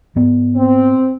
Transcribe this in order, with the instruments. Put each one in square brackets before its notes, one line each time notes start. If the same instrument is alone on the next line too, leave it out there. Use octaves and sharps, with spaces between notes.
[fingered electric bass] G#2 B3
[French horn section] C4